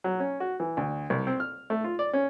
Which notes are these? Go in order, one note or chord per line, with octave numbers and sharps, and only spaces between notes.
F#3
C#4
F#4
E3
D2
C2
C4
F6
A3
F4
D5
C#4